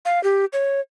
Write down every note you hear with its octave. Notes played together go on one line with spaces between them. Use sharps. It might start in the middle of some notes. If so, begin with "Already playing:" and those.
F5
G4
C#5